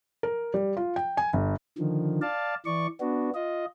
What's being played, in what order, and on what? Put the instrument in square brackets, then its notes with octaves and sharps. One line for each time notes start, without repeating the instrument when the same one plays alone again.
[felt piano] A#4
G3
F4
G5
G#5
G1
[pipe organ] D3 D#3 F3
D5 F5 A5
E3 D5 C#6
B3 D4 F#4
F4 D#5